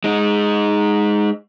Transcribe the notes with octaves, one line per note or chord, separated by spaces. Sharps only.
G#3 D#4